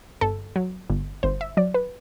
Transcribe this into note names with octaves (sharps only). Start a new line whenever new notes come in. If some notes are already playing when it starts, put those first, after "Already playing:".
G1 A4
F#3
G1
G1 C5
E5
F#3 D5
B4